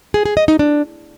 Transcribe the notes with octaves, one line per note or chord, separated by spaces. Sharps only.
G#4
G#4
D#5
D#4
D4